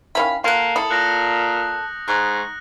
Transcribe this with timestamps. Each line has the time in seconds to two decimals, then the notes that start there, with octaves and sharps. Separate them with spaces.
0.15 D#3 C#4 E4 F5 B5
0.44 A#3 F4 A4 F#5
0.76 E4 A4 D#6 C#7 F#7
0.91 A#2 F#6 G6 A#6
2.08 G#2 C#6 F#6